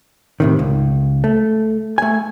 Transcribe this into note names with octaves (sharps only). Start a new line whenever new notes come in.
A2 C3 D#3
C#2
A3
A3 G#5